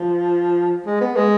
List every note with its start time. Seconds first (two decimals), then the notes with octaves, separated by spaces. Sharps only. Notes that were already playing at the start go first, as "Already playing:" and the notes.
Already playing: F3
0.86 G#3
1.01 B3
1.16 G#3